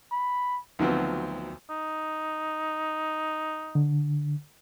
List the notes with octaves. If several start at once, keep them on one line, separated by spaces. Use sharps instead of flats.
B5
D2 D#3 F3 F#3 B3 C4
D#4
D3